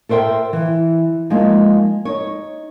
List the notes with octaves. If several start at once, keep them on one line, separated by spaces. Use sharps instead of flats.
A4 A#4 C5 E5 G5
E3
F3 G#3 A#3 D#4
D#4 C#5